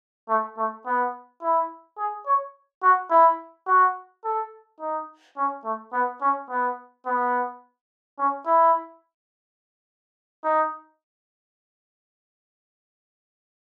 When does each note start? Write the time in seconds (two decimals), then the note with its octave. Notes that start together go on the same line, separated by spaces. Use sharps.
0.29 A3
0.57 A3
0.86 B3
1.42 E4
1.98 G#4
2.26 C#5
2.82 F#4
3.10 E4
3.67 F#4
4.24 A4
4.80 D#4
5.37 C#4
5.64 A3
5.93 B3
6.21 C#4
6.50 B3
7.06 B3
8.19 C#4
8.46 E4
10.44 D#4